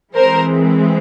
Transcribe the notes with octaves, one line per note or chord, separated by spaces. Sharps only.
E3 G#3 C4 A#4 C5